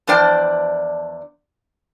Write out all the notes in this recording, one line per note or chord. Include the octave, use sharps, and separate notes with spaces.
E2 F3 D4 C5 D5 G5